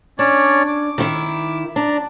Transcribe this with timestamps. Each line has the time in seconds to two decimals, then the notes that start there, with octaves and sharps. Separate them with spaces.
0.19 C#4 D4 C#5 D5
0.68 D6
0.98 D#3 E4
1.76 D4 D5 A#5